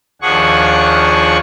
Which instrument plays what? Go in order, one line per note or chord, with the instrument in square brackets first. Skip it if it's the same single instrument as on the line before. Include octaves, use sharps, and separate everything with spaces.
[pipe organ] D#2 F3 D4 G#4 F#5 C#6